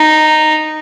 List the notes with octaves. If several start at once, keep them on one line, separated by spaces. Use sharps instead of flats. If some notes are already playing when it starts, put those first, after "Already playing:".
Already playing: D#4